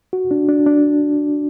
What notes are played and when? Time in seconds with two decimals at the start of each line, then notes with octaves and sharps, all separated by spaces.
0.13 F#4
0.31 D4
0.49 D4
0.66 D4